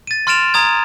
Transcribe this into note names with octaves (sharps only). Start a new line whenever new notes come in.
A6 D#7
C6 F6 A6 D7 E7 F7
A#5 D#6 G#6